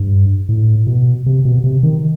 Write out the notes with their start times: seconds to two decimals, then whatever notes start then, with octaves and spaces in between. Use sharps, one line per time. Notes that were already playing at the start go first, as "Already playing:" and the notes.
Already playing: G2
0.49 A2
0.87 B2
1.26 C3
1.45 B2
1.64 C3
1.83 D#3